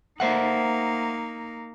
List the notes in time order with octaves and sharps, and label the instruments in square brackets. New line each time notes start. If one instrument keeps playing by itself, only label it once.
[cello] A#3 D#4 [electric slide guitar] C5 E5 F#5